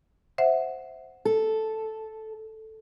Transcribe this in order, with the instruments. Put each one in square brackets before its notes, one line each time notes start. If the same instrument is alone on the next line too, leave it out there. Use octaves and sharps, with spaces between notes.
[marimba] C5 E5 F#5
[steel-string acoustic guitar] A4